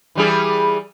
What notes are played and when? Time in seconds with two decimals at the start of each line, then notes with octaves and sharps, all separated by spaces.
0.15 E3 G3 G#4